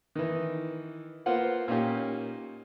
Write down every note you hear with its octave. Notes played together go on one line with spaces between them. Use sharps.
D#3 E3
A#3 B3 F4 C5 F#5
A#2 A#3 C#4 D#4 G4